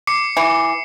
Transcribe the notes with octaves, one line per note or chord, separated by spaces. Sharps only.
D6 C7 C#7
E3